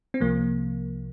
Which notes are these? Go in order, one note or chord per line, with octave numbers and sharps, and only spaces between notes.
C4
C2 C3 F3 A#3